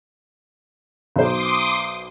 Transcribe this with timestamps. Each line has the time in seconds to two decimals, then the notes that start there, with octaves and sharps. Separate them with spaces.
1.16 B1 C5 C6 D6 D#6